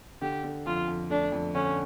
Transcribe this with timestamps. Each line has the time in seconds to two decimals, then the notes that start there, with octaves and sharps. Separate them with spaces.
0.21 D3 G4
0.44 D3
0.66 F2 F4
0.88 F2
1.10 A3 D4
1.32 F2
1.55 D3 C#4